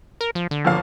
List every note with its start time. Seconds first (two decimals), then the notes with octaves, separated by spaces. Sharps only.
0.21 A#4
0.35 F3
0.51 D3
0.65 G1 F3 F5